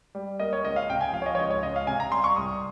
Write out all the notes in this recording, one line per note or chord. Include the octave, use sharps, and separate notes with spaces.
G3
A#3 D#5
C#5
C#2 D#5
F5
C3 G5
G#5
F3 F5
C#5
D#5
C#5
C#2 D#5
C#5
C#2 D#5
F5
C3 G#5
A#5
G3 C6
C#6
C2 D#6